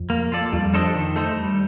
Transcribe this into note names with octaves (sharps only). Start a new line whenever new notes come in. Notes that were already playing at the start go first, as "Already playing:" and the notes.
Already playing: F2
A#3
F4 A4 D5
F2 G3
D4 A4 C5 D#5
D#3
A3 D#4 A4 C5
G3